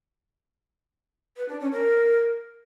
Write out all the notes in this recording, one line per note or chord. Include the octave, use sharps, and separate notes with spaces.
B4
D4
C#4
A#4